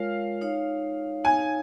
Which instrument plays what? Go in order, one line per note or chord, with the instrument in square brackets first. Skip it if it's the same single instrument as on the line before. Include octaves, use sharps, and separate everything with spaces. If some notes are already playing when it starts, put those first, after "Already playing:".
Already playing: [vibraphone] G#3 F4 A#4 C#5 [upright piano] F5
[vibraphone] D#4 C#5 F5
[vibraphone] D#4 C#5 F5 [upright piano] G#5